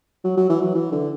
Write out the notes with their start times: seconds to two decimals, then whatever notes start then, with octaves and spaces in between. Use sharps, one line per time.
0.24 F#3
0.37 F#3
0.50 E3
0.62 F#3
0.75 E3
0.92 D3